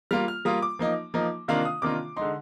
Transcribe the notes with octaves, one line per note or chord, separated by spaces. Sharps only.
G3 A#3 F4 F6
F6
G3 A#3 F4 D#6
D6
F3 A#3 D#4
F3 A#3 D#4
C3 D#3 A#3 D4 F4 F5
D#6
C3 D#3 A#3 D4 F4 D6
D3 G#3 D#4 C6